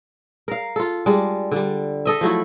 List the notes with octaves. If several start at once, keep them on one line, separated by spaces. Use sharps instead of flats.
A#4 F5
F4 A4
G3 G#3 D4
D3 G3
A4 D#5 E5
F3 F#3 A3 E4